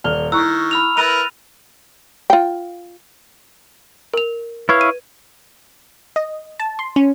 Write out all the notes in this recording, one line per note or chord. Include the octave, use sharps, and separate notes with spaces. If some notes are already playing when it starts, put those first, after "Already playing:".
D#1 D5 F6 F7 G7
D#3 E4 A#5 C#6 E6 F#6
B5 F6 F7
E4 A#4 B4 F#6 A6 A#6 D#7 F7
F4 G5
A#4 F7
E4 B4 C#5 F5 G#6
D#7
D#5
A5
C6
C#4